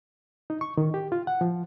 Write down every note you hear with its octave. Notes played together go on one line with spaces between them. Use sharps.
D#4
C#6
D#3
G4
F4
F#5
F3